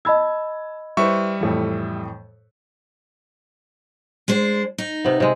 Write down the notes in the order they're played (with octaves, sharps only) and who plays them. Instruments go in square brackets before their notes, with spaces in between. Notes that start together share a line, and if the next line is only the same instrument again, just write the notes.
[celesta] D#5 B5 E6 [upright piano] A5 G#6
[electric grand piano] G3 E5 C#6 [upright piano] E4 B4 C5
[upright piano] F2 A2 E3
[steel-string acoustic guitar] G#3 D4 C5
D#4
[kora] C3 B3
C3 G#3